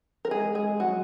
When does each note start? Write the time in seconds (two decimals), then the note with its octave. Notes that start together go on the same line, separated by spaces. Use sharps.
0.25 A#4
0.31 G#3 G#4
0.55 G#3 G#4
0.80 F#3 F#4